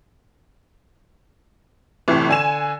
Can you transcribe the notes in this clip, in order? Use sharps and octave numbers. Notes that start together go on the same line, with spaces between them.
G1 A2 C3 E3
D3 G#5 E7